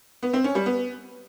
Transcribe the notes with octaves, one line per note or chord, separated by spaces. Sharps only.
B3
C4
C#4
G3
B3